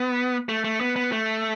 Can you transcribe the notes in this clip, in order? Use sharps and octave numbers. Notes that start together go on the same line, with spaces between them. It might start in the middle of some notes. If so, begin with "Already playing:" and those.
Already playing: B3
A3
A3
B3
B3
A3